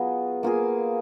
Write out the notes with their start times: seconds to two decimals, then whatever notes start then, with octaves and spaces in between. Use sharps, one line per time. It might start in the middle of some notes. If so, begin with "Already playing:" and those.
Already playing: F#3 B3 F4 G#4
0.43 A#3 F4 G#4